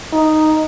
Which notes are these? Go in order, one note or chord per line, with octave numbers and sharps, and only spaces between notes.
D#4